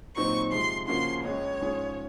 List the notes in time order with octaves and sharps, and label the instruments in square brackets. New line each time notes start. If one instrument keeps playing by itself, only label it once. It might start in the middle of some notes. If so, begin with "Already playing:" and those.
[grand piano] A#2 F#3 C4 D#4 [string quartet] C#6
[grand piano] C3 F3 G#3 [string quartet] C6
[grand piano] C#3 F3 A#3 C#4 F#4 [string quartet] C6
[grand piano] C#2 C#3 G#3 [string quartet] C#5
[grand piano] G#2 F3 G#3 C#4 G#4